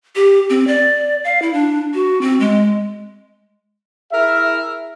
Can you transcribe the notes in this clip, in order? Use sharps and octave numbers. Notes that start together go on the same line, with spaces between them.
G4
C4
D5
F5
E4
D4
F#4
C4
G#3
E4 G#4 A#4 E5